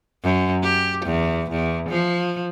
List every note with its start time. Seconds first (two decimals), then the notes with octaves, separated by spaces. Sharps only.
0.24 F#2
0.63 G4
1.05 E2
1.51 E2
1.89 F3